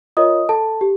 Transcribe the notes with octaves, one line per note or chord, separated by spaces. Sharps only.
F4 A#4 C#5 D#5 D#6
A4 A5
G4